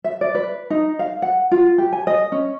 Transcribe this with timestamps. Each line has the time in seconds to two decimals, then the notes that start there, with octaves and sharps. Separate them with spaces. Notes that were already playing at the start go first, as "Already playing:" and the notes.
0.04 E5
0.21 D5
0.35 B4
0.70 D#4
0.99 F5
1.22 F#5
1.51 F4
1.78 G4
1.93 G#5
2.07 D#5
2.32 C#4